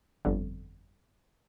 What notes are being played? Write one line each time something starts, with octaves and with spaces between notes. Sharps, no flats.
G1 F2 D3